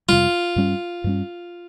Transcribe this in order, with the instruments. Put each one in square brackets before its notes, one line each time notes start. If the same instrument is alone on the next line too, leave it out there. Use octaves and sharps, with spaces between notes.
[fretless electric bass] F2 C3 G3 [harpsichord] F4
[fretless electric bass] G2 G3 C#4
G2 G3 C#4